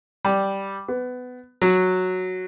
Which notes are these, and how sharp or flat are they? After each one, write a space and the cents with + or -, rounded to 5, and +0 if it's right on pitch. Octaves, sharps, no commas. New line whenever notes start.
G3 -5
B3 +20
F#3 -5